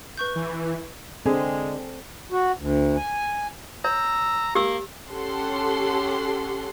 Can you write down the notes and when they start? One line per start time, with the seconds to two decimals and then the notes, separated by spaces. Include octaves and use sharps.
0.17 B4 C#6 G6
0.35 E3
1.26 D3 G#3 C4 G#4
2.32 F#4
2.58 D2
2.97 G#5
3.84 C#5 A#5 E6
4.55 A#3 G4 E6
5.11 C#4 G4 A4 F#5 C6